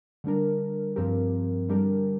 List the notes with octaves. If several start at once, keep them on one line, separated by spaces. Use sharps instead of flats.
D3 G3 D4 A#4
G2 F3 C4 G4 A#4
D3 G3 D4 G4 A#4